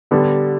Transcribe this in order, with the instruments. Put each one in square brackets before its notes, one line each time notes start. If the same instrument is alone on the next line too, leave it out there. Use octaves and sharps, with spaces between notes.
[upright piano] D3 G3 B3 D4